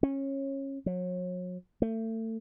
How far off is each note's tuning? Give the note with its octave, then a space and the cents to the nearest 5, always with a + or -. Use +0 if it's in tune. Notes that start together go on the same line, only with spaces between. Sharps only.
C#4 -20
F#3 -35
A3 +30